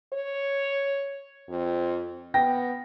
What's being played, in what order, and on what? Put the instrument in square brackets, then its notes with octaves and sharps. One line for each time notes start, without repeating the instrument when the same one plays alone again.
[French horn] C#5
F2
[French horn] B3 [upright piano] G5 A#6